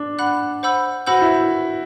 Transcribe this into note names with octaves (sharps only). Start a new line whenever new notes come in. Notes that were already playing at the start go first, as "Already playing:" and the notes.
Already playing: D4
F#5 B5 F#6
C5 F#5 B5 E6 G6
F#4 C5 F#5 B5 E6 G6
E4